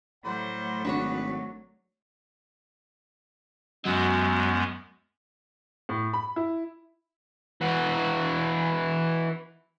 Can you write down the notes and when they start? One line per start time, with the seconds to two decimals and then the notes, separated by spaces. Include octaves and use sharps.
0.25 A2 F#3 G3 A3 C5 F#5
0.85 G#1 B3 D4 F#4 B4 C#5
3.85 F#2 F#3 G#3 B3
5.89 A2
6.13 B5
6.36 E4
7.61 E3 F#4